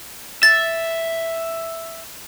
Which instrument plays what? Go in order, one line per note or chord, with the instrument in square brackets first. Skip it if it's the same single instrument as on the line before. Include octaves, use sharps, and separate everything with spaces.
[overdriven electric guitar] E5 [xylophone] A6